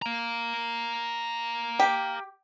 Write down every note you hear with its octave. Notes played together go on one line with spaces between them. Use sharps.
F5 A#5
G4